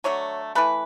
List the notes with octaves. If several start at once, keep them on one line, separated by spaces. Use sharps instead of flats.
D3 F#3 A3 C#5
E3 A3 B4